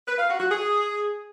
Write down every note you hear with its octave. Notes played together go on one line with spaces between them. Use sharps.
B4
F5
F#4
F#4
G#4